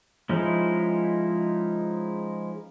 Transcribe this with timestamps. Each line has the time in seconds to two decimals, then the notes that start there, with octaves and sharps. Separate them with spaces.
0.29 F3 G#3 C#4 D#4 E4